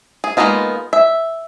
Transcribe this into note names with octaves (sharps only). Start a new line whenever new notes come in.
G#4
G#3 A#3 B3 D#4 F4
E5